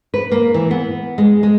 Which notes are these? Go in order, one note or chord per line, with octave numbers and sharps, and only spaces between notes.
B4
A#3
E3
B3
G#3
G#3